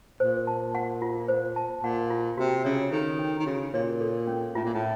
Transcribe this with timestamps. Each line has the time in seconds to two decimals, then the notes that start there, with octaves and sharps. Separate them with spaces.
0.20 A#2 C5
0.47 A5
0.75 F#5
1.02 F4
1.28 C5
1.56 A5
1.83 A#2 F#5
2.10 F4
2.38 C3 F#4
2.65 C#3 C#5
2.91 D#3 A4
3.19 C#4
3.39 D#3
3.46 C#3 F#4
3.74 A#2 C#5
4.01 A4
4.27 C#4
4.55 A2 F4
4.65 A#2
4.73 A2